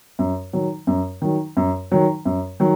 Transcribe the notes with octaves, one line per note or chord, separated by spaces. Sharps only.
F#2
D#3 F#3
F#2
D#3 F#3
F#2
D#3 F#3
F#2
D#3 F#3